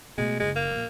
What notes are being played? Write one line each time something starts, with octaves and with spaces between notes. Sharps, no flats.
B2 G#3 A3
F#1 G#3
A#3
A#1 A#2